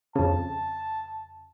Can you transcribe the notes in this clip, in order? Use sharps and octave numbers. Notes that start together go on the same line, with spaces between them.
F2 C#3 A5